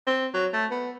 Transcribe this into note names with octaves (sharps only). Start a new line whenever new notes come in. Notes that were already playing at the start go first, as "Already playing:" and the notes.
C4
F#3
A3
B3